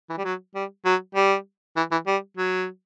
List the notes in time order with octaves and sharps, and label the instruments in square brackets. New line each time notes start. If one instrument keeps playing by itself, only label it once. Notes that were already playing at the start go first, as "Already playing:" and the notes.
[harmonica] E3
G3
F#3
G3
F#3
G3
E3
E3
G3
F#3